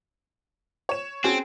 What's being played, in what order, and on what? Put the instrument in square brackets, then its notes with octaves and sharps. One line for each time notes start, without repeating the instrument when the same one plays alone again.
[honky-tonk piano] C#5 E7
[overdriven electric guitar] C4 [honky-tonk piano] C#4 F#4 G#4